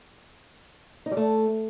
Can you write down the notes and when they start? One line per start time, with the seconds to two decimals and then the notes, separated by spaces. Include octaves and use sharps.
1.06 D#4
1.11 G3
1.17 A3